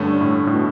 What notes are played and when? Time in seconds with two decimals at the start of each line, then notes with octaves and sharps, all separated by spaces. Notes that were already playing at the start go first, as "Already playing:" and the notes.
Already playing: G2 D3 A3 C#4
0.21 A2
0.47 A2
0.54 B2